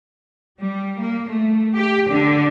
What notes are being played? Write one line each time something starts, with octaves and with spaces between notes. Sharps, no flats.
G3
A#3
A3
G4
D3